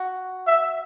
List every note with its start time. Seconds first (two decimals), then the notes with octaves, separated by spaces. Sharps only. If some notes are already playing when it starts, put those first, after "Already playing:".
Already playing: F#4
0.47 E5